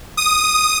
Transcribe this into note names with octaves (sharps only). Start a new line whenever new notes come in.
D#6